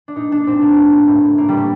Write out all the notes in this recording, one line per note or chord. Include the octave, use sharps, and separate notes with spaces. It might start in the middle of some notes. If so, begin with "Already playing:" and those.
D4
A#2 D#4
A#2 D4
A#2 C4
A#2 A#3
A2
A2
A2
A2
A2 A#3
A2 G3
A3